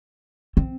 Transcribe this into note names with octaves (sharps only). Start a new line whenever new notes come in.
C4